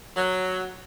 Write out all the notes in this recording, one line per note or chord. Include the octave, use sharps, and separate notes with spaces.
F#3